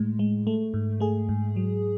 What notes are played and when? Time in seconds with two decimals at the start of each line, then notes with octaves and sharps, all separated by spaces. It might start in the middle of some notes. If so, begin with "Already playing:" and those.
Already playing: A2 G#3
0.19 G#3
0.47 A3
0.74 G#2
1.00 A3 G#4
1.29 G#2
1.56 F#3